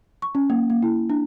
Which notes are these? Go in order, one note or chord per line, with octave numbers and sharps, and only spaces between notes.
C#6
C#4
A#3
A#3
E4
D4